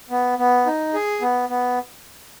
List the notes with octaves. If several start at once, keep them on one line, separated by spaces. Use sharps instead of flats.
B3
B3
D#4
G#4
B3
B3